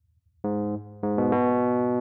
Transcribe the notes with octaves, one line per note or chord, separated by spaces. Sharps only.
G#2
G#2
B2
B2